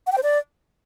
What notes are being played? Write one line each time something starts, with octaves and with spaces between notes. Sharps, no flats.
F#5
G5
C5
D5